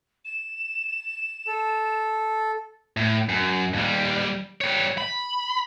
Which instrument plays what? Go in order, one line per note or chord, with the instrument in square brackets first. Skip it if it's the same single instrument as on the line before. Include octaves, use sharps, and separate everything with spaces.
[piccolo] E7
[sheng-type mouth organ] A4
[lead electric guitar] A2
F#2
D#2 G3
G3 C#5
B5